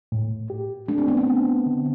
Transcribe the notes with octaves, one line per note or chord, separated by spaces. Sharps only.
A2
G4
A3 D4
C4
B3
C4
D4
D3